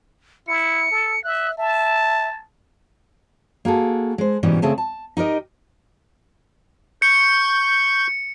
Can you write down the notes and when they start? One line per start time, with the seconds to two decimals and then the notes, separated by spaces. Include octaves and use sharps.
0.48 E4 C#7
0.91 A4
1.24 E5 F#6
1.57 E5 A5
3.65 A#3 F#4 G#4 A4
4.18 G#3 C5
4.43 G#2 B2 E3 G3 B3 C#4
4.62 C#3 A3 C4 G#4 A5
4.78 A5
5.17 D#4 G4 A#4 D#5
7.02 C#6 G6 C#7